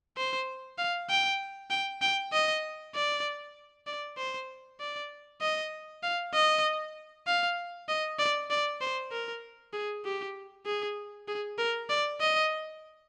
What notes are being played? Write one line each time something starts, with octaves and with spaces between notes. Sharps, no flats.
C5
F5
G5
G5
G5
D#5
D5
D5
C5
D5
D#5
F5
D#5
F5
D#5
D5
D5
C5
A#4
G#4
G4
G#4
G#4
A#4
D5
D#5